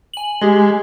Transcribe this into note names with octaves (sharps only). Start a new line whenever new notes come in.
G#5 F#7
G#3 G4 G#4 D#5